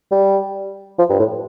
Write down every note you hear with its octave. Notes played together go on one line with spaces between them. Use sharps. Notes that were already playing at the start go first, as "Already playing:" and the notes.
G3
F3
G2
A2